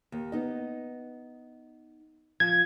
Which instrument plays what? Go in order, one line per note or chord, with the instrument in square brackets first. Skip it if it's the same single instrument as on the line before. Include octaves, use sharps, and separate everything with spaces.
[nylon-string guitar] D#2
B3 D#4 D#5
[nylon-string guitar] F3 [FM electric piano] G#6